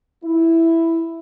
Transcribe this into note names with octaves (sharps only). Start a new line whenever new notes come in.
E4